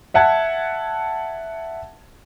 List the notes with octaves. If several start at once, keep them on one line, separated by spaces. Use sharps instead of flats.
E5 F#5 A5 G#6